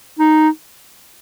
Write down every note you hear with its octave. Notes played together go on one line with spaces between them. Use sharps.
D#4